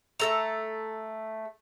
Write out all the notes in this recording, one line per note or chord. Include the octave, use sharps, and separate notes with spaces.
A3 A4 A#5